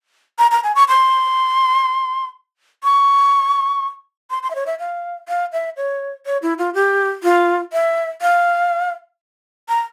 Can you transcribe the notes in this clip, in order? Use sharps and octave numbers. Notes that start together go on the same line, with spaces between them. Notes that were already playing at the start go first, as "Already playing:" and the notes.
A#5
A#5
G#5
C#6
C6
C#6
C6
C6
E5
C#5
E5
F5
F5
E5
C#5
C#5
E4
F4
G4
F4
E5
F5
A#5